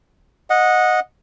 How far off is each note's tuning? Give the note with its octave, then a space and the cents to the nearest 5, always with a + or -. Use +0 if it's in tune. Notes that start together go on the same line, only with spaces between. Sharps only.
D#5 +0 F#5 -20